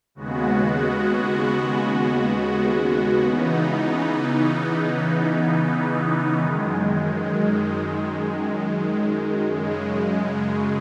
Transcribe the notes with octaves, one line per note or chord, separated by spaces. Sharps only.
D#2 C#3 G#3 B3 F#4
C#3 E3 B3 D#4
F#2 D#3 G#3
F#2 C#3 G#3